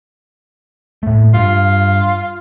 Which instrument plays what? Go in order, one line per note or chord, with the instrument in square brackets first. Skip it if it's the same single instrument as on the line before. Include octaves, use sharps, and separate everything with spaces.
[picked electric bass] A2 A3
[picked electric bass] G2 [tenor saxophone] F4